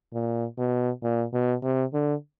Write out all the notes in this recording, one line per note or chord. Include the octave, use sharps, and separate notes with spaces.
A#2
B2
A#2
B2
C3
D3